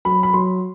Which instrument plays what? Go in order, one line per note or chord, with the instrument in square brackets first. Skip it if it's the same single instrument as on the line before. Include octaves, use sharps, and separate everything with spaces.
[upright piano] F#3 B5
B5
F#3 C6